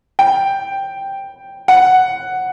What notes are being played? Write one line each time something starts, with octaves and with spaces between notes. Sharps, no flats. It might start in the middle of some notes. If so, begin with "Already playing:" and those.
G5
F#5